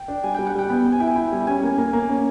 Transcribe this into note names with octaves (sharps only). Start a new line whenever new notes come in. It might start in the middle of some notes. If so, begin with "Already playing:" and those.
Already playing: G5
D4
G3 G#5
G3 G5
F#5
G3 G5
B3
B3
G#5
E4 G5
G#5
E4
G3
C#4 G#5
A#3
A#3
A#3
C#4